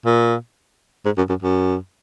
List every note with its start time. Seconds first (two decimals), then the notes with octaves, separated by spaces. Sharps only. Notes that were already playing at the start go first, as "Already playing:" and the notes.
0.05 A#2
1.05 G#2
1.17 F#2
1.29 F#2
1.42 F#2